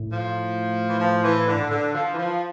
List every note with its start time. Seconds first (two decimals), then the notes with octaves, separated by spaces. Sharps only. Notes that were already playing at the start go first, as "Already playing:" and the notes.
Already playing: A2
0.11 F3
0.87 E3
1.00 F3
1.22 E3
1.47 D3
1.70 D3
1.94 F3
2.13 E3
2.17 F3